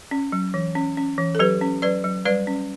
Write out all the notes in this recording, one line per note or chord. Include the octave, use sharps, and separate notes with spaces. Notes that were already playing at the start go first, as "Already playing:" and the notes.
C#4
F#3
E3
C#4
C#4
E3
A4
F#3 G4 B4
C#4
F#3 B4 D5
F#3
G3 B4 D5
C#4